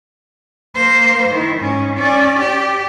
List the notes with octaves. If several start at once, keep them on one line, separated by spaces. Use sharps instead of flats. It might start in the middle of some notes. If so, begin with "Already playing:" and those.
A#3 C5
D#3 E4
G#2 C#4
C#4 D5
G4